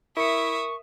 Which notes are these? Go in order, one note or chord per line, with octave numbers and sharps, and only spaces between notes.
E4 A#4 E5 C#6 D#6 C#7